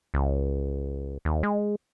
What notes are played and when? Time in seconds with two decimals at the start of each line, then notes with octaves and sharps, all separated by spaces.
0.14 C#2
1.25 D#2
1.43 G#3